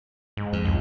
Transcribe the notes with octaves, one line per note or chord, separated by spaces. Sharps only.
G#2
F2
C#2